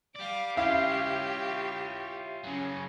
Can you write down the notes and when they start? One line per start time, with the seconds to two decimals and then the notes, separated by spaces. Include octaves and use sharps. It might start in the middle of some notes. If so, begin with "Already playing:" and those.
0.16 G4 D5 F5 D6
0.57 C#4 E4 F4 G4 C#5 E5 F5
2.44 C#3 F#3 C#4 G#4